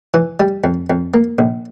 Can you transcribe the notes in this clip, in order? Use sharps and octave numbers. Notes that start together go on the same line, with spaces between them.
E3
G3
F2
F2
A#3
A#1